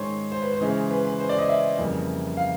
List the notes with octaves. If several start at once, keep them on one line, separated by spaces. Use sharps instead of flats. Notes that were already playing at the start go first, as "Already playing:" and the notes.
Already playing: G#2 D#3 G#3 C#4 C5 C#5
C5
B4
C5
C#3 E3 G#3 C#4
B4
B4
C5
D5
D#5
E5
F2 C#3 E3 G3 A#3
F5